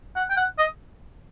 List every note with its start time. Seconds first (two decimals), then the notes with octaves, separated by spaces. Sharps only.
0.16 F#5
0.30 G5
0.37 F#5
0.58 D#5